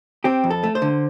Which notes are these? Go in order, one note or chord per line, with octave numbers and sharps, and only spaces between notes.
C4 G4
F2
A4
A3
C5
D3